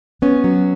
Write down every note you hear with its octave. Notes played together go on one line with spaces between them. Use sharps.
B3 C#4
F#3